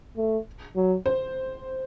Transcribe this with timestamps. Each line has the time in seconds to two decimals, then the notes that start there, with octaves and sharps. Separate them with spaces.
0.17 A3
0.76 F#3
1.06 C5